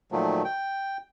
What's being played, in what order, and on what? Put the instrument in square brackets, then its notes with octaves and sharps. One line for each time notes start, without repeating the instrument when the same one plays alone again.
[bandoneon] A#2 D#3 F3 F#3 A3
G5